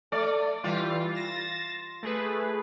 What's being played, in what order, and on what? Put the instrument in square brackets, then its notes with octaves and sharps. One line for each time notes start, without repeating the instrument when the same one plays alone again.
[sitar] A3 D5
[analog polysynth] E3 G3 [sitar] F4
[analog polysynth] A6 A#6 E7
A3 G#4 B4